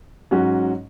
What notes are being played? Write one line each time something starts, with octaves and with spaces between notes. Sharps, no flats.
G#2 F#3 C#4 F#4